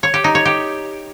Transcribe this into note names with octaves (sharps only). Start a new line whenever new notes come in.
C#5
G4
D#4
C#5
G4